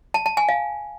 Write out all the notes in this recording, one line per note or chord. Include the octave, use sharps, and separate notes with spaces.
A5
A5
G#5
F5